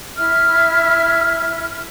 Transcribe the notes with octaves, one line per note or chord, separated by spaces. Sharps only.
E4 E5 F6